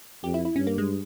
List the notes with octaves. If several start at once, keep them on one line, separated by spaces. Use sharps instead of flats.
F2 G4
E4
E4
G2 C#4
A#3
G#3